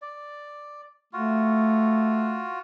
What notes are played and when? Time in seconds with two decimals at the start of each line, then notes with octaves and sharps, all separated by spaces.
0.02 D5
1.13 A3 F4 F#4